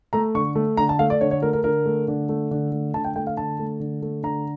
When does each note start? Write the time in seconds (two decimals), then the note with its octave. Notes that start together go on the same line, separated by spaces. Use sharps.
0.13 A3 A#5
0.35 D3 C#6
0.55 A3
0.77 D3 A#5
0.89 A5
0.99 A3 F5
1.10 D5
1.21 D3 C#5
1.31 C#5
1.42 A3 A#4
1.53 A#4
1.64 D3 A#4
1.86 A3
2.08 D3
2.29 A3
2.51 D3
2.72 A3
2.94 D3 A5
3.05 G5
3.16 A3 G5
3.27 F5
3.37 D3 A5
3.59 A3
3.80 D3
4.02 A3
4.23 D3 A#5